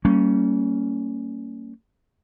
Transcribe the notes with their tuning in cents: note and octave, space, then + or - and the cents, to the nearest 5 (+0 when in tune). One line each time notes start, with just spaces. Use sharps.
G3 -35 A#3 -35 C#4 +0